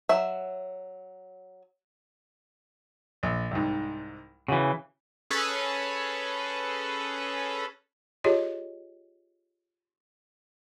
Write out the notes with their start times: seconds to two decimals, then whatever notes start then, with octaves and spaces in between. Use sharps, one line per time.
0.09 F#3 E5
3.23 A#1
3.51 C2 G#2
4.48 C#3 E3 F#4
5.30 C#4 G#4 A4 B4
8.24 F4 G4 G#4 C#5 D#5